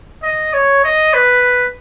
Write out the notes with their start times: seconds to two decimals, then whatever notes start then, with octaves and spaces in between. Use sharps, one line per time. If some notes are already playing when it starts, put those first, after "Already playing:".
0.23 D#5
0.53 C#5
0.84 D#5
1.13 B4